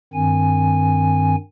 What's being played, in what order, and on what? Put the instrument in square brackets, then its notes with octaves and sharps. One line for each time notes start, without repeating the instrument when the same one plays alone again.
[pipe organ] G2 D#3 C4 G#5